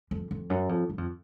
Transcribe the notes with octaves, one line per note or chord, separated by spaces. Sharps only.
F2
F2
F#2
F2
F#2
F2